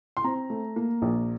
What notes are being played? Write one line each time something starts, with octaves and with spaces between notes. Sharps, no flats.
C6
C4 A#5
A3
A#3
A#1